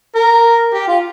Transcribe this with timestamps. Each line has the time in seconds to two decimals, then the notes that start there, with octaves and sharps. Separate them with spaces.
0.15 A#4
0.73 G4
0.88 F4